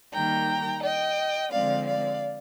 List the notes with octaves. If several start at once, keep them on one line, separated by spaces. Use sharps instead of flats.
D#3 G3 A#3 G5 A#5
D#5 G5
D3 F3 G#3 C4 D5 F5
D5 F5